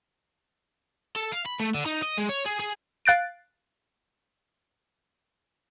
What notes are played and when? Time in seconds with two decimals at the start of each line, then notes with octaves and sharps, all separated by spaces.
1.16 A4
1.32 F5
1.46 B5
1.60 A3
1.74 D3
1.86 D#4
2.02 D#5
2.18 G#3
2.29 C#5
2.45 G#4
2.59 G#4
3.05 F5 F#6 A6 D7